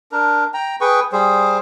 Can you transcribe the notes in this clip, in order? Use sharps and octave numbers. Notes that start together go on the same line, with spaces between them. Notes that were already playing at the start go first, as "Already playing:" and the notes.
D4 A#4
G5 A#5
G#4 B4 G5 C#6
G3 G#4 C5